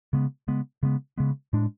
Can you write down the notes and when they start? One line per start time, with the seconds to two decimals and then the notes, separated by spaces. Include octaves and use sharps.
0.13 C#3 G#3 B3
0.48 C#3 G#3 B3
0.83 C#3 G#3 B3
1.18 C#3 G#3 B3
1.53 A2 G#3 D4